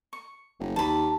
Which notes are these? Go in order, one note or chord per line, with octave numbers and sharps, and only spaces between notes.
C#6
F#1
D#2 A5 B5